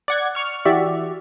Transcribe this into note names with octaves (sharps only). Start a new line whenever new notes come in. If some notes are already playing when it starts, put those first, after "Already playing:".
D5 F#5 G#6
C#6 F6
E3 F#4 G4 D5 E5